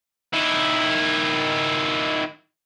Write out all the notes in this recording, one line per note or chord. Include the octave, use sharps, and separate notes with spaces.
D#3 E4